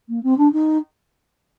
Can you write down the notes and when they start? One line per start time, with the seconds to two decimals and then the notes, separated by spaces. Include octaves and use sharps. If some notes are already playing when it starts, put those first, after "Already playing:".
0.09 A#3
0.23 C4
0.38 D4
0.52 D#4